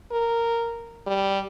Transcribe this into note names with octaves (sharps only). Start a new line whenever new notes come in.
A#4
G3